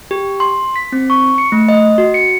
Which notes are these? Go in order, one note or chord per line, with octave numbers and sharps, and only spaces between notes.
G4
C6
B6
C4
C#6
C#7
A3
D#5
F#4
C#7